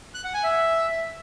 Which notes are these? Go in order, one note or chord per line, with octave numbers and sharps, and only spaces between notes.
F#6
F#5
G#5
E5